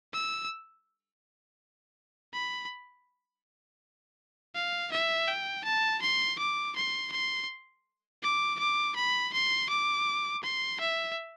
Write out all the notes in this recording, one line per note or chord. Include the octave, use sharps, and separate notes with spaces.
E6
B5
F5
E5
G5
A5
C6
D6
C6
C6
D6
D6
B5
C6
D6
C6
E5